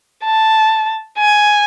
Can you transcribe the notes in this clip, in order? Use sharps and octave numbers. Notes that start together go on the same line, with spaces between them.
A5
G#5